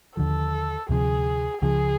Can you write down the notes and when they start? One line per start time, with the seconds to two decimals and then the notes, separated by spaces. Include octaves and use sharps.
0.17 D#2 D3 F3 A4
0.89 D2 C3 F3 G#4
1.62 C#2 C#3 F3 G#4